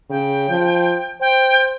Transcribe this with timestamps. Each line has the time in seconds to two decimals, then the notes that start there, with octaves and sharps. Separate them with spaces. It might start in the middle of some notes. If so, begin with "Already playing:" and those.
0.10 C#3 G5
0.50 F3
1.21 C5 G5